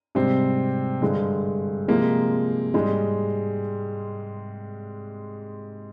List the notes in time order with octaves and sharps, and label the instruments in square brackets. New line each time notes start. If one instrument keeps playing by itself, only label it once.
[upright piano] G#2 C3 G3 C4
G2 D3 G#3
C3 F3 G#3 A#3
G#2 G3 G#3